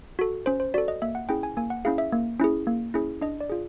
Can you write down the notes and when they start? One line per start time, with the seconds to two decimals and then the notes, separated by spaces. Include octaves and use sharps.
0.19 F#4 A4
0.46 C#4 C5
0.60 C5
0.74 F#4 A4 D5
0.88 D#5
1.02 A#3 E5
1.15 F#5
1.29 C#4 E4 G#4 G5
1.43 G#5
1.57 A#3 G#5
1.70 F#5
1.85 C#4 E4 G#4 F5
1.98 E5
2.12 A#3
2.40 C#4 E4 G#4
2.67 A#3
2.94 C#4 E4 G#4
3.21 D4 D#5
3.40 D5
3.49 F4 G#4